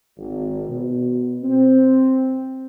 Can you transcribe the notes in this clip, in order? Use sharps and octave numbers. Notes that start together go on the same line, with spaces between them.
G#1
B2
C4